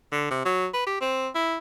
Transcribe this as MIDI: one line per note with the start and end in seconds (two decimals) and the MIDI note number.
0.12 0.29 50
0.31 0.41 48
0.45 0.67 54
0.74 0.86 71
0.87 1.00 67
1.01 1.28 60
1.35 1.57 64